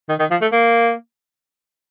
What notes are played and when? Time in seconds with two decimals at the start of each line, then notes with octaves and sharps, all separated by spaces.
0.09 D#3
0.19 D#3
0.31 F3
0.42 A3
0.52 A#3